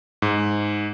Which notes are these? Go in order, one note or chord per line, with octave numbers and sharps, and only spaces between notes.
G#2